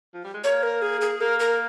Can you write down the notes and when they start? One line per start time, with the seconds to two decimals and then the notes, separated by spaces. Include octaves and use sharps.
0.14 F3
0.24 G3
0.34 G#3
0.44 A#3 C#5
0.63 A#4
0.82 G#4
1.01 G#4
1.21 A#3 A#4
1.40 A#4